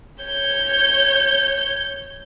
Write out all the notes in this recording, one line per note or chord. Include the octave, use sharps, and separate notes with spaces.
C#5 G6